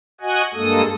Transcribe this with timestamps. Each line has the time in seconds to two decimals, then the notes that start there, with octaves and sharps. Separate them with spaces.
0.21 F#4 D#5 F#5 G#5
0.55 G2 G#3 A#3 A4 D#6